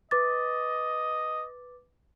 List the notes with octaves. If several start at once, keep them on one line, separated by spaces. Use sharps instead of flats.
B4 D#5 D6 A6